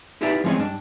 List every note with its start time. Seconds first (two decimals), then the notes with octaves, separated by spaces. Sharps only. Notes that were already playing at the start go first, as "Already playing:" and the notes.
0.21 D#4 E4 G4 B4 D5 E5
0.44 F3 G#3 C4 C#4 C#5 D#5
0.57 G2 D4